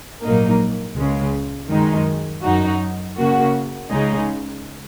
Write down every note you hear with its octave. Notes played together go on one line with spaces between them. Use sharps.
A#1 G#2 F#3 A#3 D#4
C#2 C#3 G#3
F#2 D#3 G#3 D#4
F#2 F#3 D#4 F#4
C#3 A#3 F#4
C#2 C#3 G#3 D#4 G#4